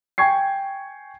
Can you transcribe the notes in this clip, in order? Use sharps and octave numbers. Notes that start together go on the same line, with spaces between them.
G5 G#5 C#6 G#6 C7